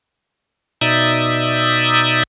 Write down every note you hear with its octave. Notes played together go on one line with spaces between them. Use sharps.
B2 D#4 D5 E5 D#6 E6